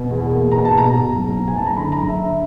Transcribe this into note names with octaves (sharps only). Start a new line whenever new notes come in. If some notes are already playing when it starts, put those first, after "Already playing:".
Already playing: B2
E2
A#3
B2 A#5
A5
B2 A#5
B2
F#1
F#1
G#5
F#1 A5
A#5
D3 B5
A#5
F#1
E5
D3 E5